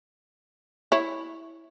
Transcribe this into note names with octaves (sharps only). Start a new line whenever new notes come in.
E4 C#5